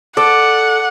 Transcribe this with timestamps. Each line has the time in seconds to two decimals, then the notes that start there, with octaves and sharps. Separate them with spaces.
0.17 A4 D5 F#5